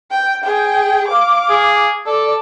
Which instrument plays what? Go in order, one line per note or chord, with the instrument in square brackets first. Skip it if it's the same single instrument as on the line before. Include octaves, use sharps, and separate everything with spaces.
[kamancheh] G5
G#4 G5
F5 D6
[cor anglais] G#4
[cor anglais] A4 [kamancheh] D5